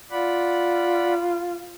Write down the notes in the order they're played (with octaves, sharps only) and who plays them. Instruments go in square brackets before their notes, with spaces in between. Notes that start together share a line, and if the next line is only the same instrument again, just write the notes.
[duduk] F4 [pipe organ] D5 F#5 B5